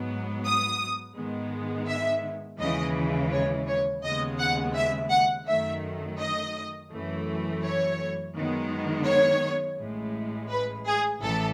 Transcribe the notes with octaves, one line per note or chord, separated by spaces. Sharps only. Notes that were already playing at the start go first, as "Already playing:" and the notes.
Already playing: G#2 F#3 B3
D#6
G#2 D#3 G#3 B3
E5
D#2 C#3 E3 G#3 D#5
C#5
C#5
D#2 C#3 G#3 B3 D#5
F#5
E5
F#5
F#2 D#3 A3 E5
D#5
F#2 E3 A3
C#5
F#2 D#3 G#3 B3
C#5
A1 A2 G#3
B4
G#4
A1 A2 E3 A4